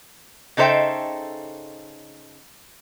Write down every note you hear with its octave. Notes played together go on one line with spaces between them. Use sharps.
C#3 D#4 A4 C5 E5 G5